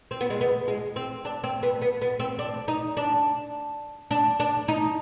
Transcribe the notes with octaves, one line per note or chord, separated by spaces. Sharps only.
C4
B3
G#3
B3
G#3
C4
D4
C4
B3
B3
B3
C4
D4
D#4
D4
D4
D4
D#4